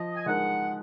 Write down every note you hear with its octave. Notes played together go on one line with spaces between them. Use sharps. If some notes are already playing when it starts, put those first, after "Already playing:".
Already playing: F3 D#5
G#5
G#3 D#4 A#4 F#5